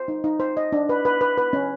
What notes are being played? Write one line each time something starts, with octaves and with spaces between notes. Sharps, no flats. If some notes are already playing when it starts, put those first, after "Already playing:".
Already playing: C5
D#4
D#4
C5
D#5
D4
B4
B4
B4
B4
C#4